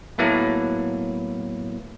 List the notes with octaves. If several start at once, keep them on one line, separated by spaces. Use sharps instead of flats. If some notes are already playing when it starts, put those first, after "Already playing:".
A2 F#3 A#3 B3 E4